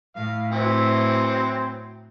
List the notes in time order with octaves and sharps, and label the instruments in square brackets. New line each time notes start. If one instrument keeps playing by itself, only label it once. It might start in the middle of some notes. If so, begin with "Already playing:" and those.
[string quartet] A2 [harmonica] F5
[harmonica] E3 F#3 [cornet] C4